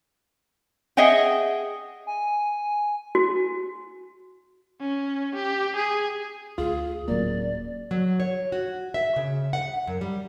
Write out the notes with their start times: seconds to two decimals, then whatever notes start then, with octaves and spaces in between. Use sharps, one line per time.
0.97 G#4 D#5 E5 F#5 G5
2.07 G#5
3.15 F#4
4.81 C#4
5.35 G4
5.76 G#4
6.58 D2 F4 G#4
7.08 D1 F#3 A#3 C#4 D5
7.91 F#3
8.20 C#5
8.52 F#4
8.94 E5
9.16 C#3
9.53 F#5
9.87 F#2
10.01 G3